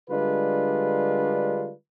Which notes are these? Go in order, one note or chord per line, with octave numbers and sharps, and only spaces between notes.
D3 G3 G#3 D4 F4 B4